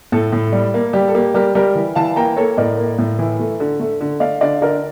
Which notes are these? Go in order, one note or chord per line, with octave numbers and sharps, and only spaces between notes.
A2 A4
A2
G3
A#3
G3 G4
A4
A#3 G4
G3 G4 A#4
G3 G4 A#4
E3
E3 F5 A5
A#3 G5 A#5
A#3 A4 C#5
A2 A#4 D5
A#3
A2
E3
A3
D3
A3
D3
A3 D5 F5
D3 D5 F5
D3 A#4 D5